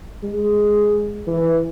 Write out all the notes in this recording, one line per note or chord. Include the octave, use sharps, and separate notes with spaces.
G#3
E3